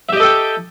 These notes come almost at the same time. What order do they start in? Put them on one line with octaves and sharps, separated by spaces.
E5 G4 D#5 A4 G5